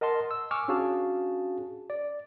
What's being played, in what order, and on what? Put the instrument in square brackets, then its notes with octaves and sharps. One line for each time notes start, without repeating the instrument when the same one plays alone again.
[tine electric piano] A#4 D#5 F#5 A5 C6
E6
G#5 C#6 D6 E6 F6
C#4 D4 F#4 G#4 F5 A5
D5